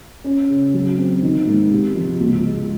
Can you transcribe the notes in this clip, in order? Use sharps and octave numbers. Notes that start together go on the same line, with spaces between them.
C#4
C#3
F#3
C4
D#3
G#2
C3
F3
C#2
G#3